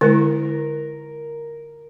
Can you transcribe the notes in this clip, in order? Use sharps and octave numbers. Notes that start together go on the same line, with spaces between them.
D3 G#3 E4 A#4